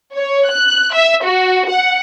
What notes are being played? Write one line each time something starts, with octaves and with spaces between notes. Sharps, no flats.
C#5
F#6
E5
F#4
F#5